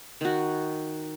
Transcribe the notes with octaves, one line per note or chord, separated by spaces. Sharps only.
D#3 F#4